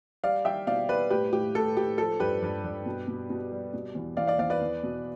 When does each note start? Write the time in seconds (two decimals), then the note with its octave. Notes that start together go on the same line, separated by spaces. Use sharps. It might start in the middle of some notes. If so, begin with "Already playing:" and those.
0.23 G3 D5 F5
0.45 G3 E5 G5
0.67 B2 D5 F5
0.89 G3 B4 D5
1.10 A2 G4 B4
1.33 A2 G4
1.55 A2 A4
1.76 A2 G4
1.98 F3 A4
2.20 G2 G4 B4
2.42 G2
2.64 G2
2.86 B2
3.08 B2
3.30 B2
3.52 G3
3.73 B2
3.95 E2
4.17 E2 D5 F5
4.27 D5 F5
4.39 E2 D5 F5
4.50 B4 D5
4.61 E2
4.83 B2